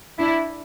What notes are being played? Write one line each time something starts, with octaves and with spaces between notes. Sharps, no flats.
D4 E4